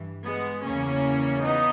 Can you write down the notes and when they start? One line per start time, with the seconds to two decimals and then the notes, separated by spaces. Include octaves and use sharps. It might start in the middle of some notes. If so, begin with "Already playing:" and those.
Already playing: G2 E3
0.23 G#3 B3
0.62 E2 C#3 E3 A#3 C#4
1.41 B3 D#4